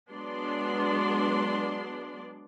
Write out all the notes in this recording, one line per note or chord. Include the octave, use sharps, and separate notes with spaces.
F#3 G#3 B3 D4 D5 C6